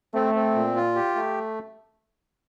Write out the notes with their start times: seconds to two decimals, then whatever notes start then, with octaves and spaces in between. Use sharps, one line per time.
0.14 A3 C4
0.34 C4
0.55 A#2
0.76 F4
0.96 G4
1.15 A3